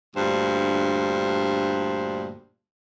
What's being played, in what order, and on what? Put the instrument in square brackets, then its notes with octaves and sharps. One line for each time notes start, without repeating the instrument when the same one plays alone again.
[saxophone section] D2 G2 A#2 C5